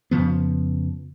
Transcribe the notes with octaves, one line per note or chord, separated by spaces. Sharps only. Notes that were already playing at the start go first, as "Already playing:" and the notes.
F2 C#3 F3 B3